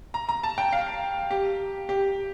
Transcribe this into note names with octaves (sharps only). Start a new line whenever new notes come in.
A#5
A#5
A5
G5
F5
G4
G4